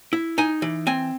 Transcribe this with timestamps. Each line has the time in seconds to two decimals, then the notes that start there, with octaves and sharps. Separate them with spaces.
0.13 E4
0.38 D#4 G#5
0.62 E3
0.87 C4 G#5